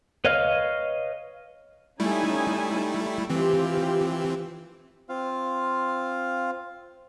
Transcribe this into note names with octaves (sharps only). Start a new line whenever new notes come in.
B4 C#5 D#5 F5 F6
G3 A3 C#4 D#4 E4 G#5
E3 C4 F4 G4
C4 F4 F5